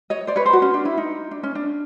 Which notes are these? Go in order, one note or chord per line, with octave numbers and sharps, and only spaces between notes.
C#5 D#5
C5 D5
B4 C#5
C5
F#4
C#4
D4
E4
D#4
D4
C#4
D4